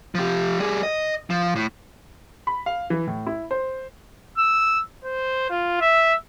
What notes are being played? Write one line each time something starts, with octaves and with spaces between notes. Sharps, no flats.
F3 G4
G3 G#4
D#5
F3
A2
B5
F5
E3
A2
E4
C5
E6
C5
F4
E5